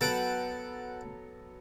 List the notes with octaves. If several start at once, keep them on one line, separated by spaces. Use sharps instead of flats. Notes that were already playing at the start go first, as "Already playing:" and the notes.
F#3 B3 A4 B4 F#5 G5 A5